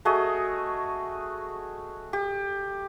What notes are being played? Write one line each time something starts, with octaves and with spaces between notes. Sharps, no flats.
A3 F#4 G#4 D#5
G4